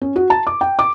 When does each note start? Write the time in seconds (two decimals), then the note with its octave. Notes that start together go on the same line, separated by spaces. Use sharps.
0.02 C#4
0.16 F#4
0.30 A5
0.47 D6
0.61 G5
0.79 D6